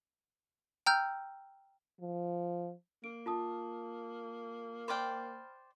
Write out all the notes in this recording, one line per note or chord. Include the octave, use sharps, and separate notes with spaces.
G5 A#5 E6 F6 G6
F3
A#3 D7
F4 A5 D#6
C5 D5 G5 B5 F6 F#6